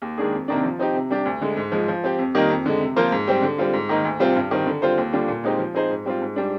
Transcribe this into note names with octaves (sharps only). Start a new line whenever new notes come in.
D#2
D#3 G#3 D4 G#4
F2
C3 D#3 A#3 D4
F3
C4 D#4 G4
C3
G3 D4 G4
D2
D3 G#3
G#2
F3 G#3
F3
C4 G4
F2
D#3 G3 A#3 D#4
F2
D3 G#3
C3
F3 A#3 F4 C5
G#2
G3 C4 G4
D3
G3 C4 F4
G#2
D#3 A#3 D#4
D2
C3 G3 C4 F4
G2
D#3 G3 C4
D3
G3 C4 F4 C5
D#2
D3 G3 D4 F4
A#2
G#3 C4 D#4 G4
F3
C4 D#4 G#4 C5
G#2
G3 C4 F4
G#2
G3 D4